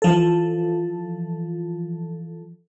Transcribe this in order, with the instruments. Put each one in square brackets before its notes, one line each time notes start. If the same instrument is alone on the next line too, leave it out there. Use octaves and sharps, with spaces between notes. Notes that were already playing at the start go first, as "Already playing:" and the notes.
[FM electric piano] E3 F3 A4